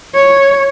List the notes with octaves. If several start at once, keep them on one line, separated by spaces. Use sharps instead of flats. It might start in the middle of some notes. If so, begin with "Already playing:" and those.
C#5